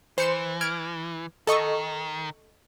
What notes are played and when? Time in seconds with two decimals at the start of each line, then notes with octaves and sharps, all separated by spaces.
0.18 E3 C5 C#7 E7
0.61 F6 G#6 D7
1.47 D#3 A4 D#5 C#6